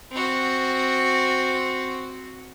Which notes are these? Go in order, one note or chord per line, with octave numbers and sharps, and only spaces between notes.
C4 F#4